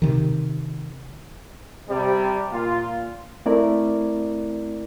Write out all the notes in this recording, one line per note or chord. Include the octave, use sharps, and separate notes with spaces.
C3 D#3
C3 G3
A#2 F4
A3 C4 E4 A#4 D5